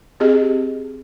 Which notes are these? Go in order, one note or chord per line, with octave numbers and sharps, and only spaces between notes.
C4 G4 G#4 D#5